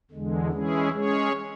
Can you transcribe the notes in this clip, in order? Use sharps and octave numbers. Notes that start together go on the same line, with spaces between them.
E2 D3 G#3
E3 G#3 C#4 E4 G#4
G#3 C#4 G#4 C#5